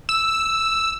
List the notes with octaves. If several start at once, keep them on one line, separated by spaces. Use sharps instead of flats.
E6